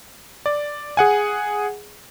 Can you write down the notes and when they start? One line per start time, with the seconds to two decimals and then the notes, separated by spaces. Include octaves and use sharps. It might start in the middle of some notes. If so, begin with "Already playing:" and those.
0.46 D5
0.97 G#4 F#5 G#5